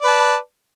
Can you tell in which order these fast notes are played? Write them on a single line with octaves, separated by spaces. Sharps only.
D5 B4 A5